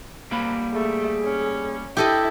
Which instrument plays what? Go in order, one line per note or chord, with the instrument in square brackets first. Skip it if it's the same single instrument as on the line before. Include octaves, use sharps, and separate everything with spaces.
[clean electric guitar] G3 A#3 B5
[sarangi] A3 [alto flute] G#4
[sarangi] C#4
[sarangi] E4 [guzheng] G4 A4 D#5